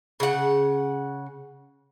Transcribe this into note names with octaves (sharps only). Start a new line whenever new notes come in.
C#3 F#5